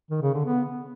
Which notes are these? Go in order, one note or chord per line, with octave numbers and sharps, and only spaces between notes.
D#3
C#3
D3
B3